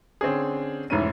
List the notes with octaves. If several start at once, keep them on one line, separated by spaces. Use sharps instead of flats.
D3 C4 C#4 G#4
F1 G#2 E3 C#4 D#7